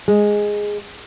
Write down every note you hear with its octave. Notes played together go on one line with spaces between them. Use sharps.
G#3